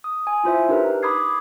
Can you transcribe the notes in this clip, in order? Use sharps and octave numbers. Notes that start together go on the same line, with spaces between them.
D#6
G#5
E4 F4 C5 E5
D4 D#4 G4 A#4 B4
B5 D6 D#6 G#6 C7